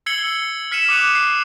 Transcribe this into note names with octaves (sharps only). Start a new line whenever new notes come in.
E6 G#6 C7 C#7 F#7 G7
F6 B6 C#7 D#7 E7
D6 D#6 F#6 D#7 F7
C7